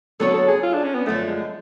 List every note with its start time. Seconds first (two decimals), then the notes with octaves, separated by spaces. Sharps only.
0.20 D3 F#3 B3 F#4 A4 C#5
0.34 A4
0.48 G#4
0.63 F4
0.74 D4
0.84 C#4
0.95 B3
1.06 F#2 D3 F3 A3
1.28 G#3